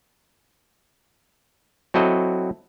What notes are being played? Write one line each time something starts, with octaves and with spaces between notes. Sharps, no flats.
F#3 C4 E4 F#4 A4 D#5